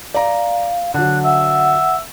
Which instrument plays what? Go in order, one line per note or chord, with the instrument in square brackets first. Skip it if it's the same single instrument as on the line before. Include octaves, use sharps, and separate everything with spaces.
[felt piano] D5 A#5 [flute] F5
[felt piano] D3 F#3 [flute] F#6
[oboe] E5 [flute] F#5